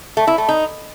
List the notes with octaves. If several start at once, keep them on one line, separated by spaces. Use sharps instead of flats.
A3
E4
A3
D#4